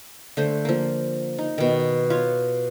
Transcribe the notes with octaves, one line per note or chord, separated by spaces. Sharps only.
D3 A3 C5
F3 A#3
D#4
B2 D#3
F4 C#5